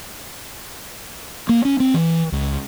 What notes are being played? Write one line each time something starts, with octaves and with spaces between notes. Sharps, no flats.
A#3
C#4
C4
E3
C#2